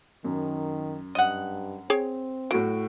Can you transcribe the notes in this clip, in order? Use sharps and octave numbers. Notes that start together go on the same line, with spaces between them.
F#2 D#3
G2 D#5 F#5
C4 G#4 C#5 G5
A2 F#3 F#4 D7